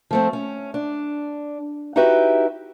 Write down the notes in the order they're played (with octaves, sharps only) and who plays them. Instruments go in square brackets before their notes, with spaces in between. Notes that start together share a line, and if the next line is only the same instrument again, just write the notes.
[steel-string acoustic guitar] F3 A3 C4
C#4
D4
D#4 E4 F#4 G4 B4 E5